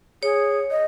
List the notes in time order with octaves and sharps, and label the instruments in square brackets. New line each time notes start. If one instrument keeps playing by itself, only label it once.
[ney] G#4 [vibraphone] C#5
[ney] D#5